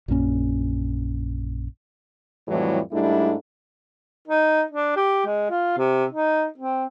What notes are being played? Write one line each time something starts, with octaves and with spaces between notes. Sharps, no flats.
A#1 F#2 A#3 C#4
F2 A2 E3 F#3 G3
G#2 G3 A3 D4 E4
D#4
D4
G4
G#3
F4
C3
D#4
C4